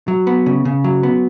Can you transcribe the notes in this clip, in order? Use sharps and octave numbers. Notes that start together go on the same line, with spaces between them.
F#3
B3
C#3
C#3
F#3
B3